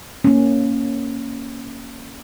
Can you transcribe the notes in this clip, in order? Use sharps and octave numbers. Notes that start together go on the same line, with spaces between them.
A#3 C#4